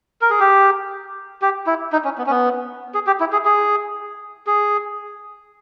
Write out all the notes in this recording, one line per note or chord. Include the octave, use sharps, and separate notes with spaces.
A#4
G#4
G4
G4
E4
D#4
C#4
B3
C#4
B3
G#4
G4
E4
G#4
G#4
G#4